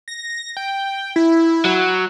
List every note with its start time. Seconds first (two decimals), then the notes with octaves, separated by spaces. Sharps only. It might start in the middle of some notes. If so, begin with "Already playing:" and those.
0.08 A#6
0.57 G5
1.16 E4
1.65 F#3